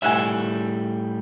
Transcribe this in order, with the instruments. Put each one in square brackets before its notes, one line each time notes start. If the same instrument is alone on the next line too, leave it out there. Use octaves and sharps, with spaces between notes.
[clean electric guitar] A2 G3 E5 [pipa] C#4 F#5 G#5